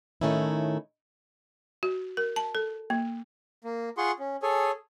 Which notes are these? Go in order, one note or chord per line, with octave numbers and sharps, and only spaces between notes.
A2 D#3 A3 C#4 D#4 E4
F#4
A#4
A5
A4
A#3
A#3
F4 G#4 F#5 C6 C#6
C#4
G#4 A4 C#5 G#5